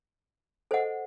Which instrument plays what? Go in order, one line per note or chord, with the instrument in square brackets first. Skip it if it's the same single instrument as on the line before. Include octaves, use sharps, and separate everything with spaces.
[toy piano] A4 C5 D#5 F#5